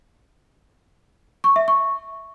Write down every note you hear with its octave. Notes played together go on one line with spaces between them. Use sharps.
C#6
E5
C#6